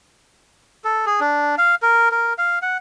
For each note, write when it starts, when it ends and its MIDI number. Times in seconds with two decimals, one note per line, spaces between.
0.84 1.05 69
1.06 1.20 68
1.20 1.55 62
1.58 1.75 77
1.82 2.09 70
2.11 2.33 70
2.38 2.59 77
2.62 2.77 78